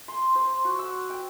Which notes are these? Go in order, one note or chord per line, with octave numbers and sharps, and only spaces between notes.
C6
C5
F#4
E6
G5